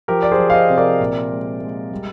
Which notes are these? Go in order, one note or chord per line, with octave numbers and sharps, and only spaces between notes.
F3 G4 A#4
D5
G#4 C5
F3
F5
C5 D#5
C3
A#4 D5
A#2
G#3
G#3
G3